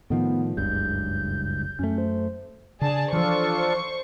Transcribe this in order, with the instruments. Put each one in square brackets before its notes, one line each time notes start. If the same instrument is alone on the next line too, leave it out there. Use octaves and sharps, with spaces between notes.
[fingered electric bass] A2 D#3 F3 [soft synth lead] B3
[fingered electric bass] F#1 C#2 G2 [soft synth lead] G6
[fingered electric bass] F#2 A3 [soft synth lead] C#4
[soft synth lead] C5
[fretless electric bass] C#3 [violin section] D4 G#4 A5
[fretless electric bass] E3 F3 [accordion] D4 F4 A4 [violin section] C5 C#6